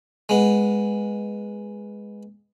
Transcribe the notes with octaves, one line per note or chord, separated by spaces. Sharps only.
G#3 B3